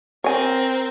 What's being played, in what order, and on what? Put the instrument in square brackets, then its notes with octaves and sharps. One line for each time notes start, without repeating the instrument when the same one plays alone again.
[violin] C4 A#4 [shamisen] C#5 G#5